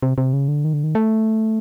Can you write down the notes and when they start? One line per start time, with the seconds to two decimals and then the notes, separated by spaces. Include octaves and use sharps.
0.03 C3
0.18 C3
0.33 C#3
0.48 D3
0.64 D#3
0.73 D3
0.84 D#3
0.95 A3